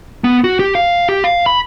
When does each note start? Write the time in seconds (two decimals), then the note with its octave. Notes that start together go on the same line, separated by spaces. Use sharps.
0.24 B3
0.44 F#4
0.59 G4
0.75 F5
1.09 G4
1.24 F5
1.46 B5